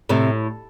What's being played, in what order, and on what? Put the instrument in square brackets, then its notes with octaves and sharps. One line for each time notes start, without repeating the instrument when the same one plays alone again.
[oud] A2 [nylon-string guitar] C3